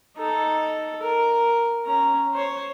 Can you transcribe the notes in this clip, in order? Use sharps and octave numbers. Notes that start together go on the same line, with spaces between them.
D#4 A4
A#4
C#4 A#5
C5 C#5